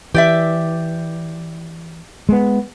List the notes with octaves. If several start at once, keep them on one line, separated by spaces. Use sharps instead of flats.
E3 G4 D5 E5
G#3 B3